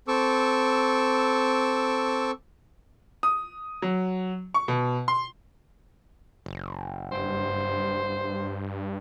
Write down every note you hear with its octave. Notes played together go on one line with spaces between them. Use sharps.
C4 A4 C#6 D6 E6
D#6
F#3
C#6
B2
C6
F#1
G2 C5